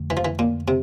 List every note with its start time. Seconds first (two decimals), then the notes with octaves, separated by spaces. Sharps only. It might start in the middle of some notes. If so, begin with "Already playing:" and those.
Already playing: F2 D3 A3
0.10 E3
0.17 F3
0.25 E3
0.39 A#2
0.68 C3